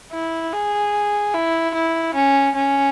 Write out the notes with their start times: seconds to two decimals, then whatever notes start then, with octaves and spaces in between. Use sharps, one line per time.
0.12 E4
0.52 G#4
1.34 E4
1.74 E4
2.14 C#4
2.55 C#4